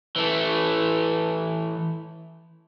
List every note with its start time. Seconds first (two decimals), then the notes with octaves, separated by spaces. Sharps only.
0.16 E3 A3